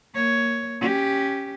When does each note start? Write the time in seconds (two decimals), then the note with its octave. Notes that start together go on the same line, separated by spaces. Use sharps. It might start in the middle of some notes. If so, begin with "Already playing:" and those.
0.14 A#3 C#5
0.81 C#4 G4